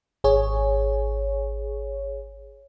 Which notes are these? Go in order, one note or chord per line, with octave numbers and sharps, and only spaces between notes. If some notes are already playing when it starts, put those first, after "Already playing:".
G#1 G#4 C#5